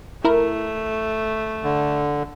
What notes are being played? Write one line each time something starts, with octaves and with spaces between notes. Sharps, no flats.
A3 E4 A#4
D3